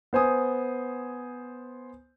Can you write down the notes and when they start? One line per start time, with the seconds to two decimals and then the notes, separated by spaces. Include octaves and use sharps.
0.13 B3 C5 G#5 D#6